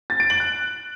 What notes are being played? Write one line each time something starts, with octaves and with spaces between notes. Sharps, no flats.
A6
D7
F#7
F#6